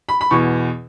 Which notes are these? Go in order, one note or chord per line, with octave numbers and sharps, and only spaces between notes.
B5
B5
E2 B2 C#6